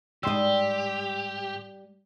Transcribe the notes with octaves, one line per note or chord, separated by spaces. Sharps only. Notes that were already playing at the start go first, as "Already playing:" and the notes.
G#2 G3 G4 D#5 C6 E6